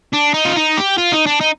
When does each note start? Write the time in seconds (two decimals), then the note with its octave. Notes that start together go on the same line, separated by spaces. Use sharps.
0.13 D4
0.34 D#4
0.45 F4
0.56 D#4
0.77 G4
0.98 F4
1.13 D#4
1.26 D4
1.41 D#4